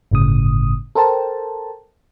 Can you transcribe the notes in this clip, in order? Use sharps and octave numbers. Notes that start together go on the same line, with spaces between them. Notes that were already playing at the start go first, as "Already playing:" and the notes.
G1 A2 C#3 D#6
A4 A#4 C5 G5 A5